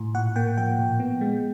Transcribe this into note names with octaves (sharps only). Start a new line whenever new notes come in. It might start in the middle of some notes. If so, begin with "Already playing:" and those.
Already playing: A2
A#2 F#5
A#3 G5
F3 G5
A#2
B3
G#3